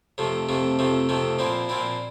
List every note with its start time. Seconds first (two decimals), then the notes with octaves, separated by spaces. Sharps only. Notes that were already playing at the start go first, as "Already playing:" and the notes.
0.18 F2 C3 F3 A3
0.49 F2 C3 F3 A3
0.79 F2 C3 F3 A3
1.09 F2 C3 F3 A3
1.39 A#2 F3 C4 E4
1.69 A#2 F3 C4 E4